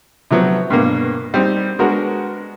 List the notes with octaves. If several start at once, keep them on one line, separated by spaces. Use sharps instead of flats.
C3 F3 F#3 B3
G2 B2 A#3
G3 C4 D#4
G#3 B3 D4 F#4 A#4